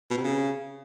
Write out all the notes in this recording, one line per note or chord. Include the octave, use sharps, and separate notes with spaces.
B2
C3
C#3